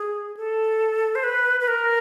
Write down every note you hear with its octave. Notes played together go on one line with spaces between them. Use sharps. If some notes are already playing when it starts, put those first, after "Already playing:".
Already playing: G#4
A4
C5
B4
B4
A#4